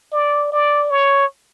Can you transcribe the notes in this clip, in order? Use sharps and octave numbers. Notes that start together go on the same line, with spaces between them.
D5
D5
C#5